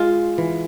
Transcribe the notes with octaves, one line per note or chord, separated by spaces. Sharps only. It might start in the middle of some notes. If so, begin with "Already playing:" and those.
Already playing: G#3 F4
E3